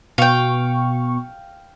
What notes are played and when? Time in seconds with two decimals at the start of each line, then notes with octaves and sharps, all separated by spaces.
0.18 B2 F5 G5 C#6